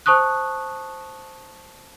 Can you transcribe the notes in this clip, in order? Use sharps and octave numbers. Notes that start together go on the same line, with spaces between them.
C5 A5 C#6 D#6 F#6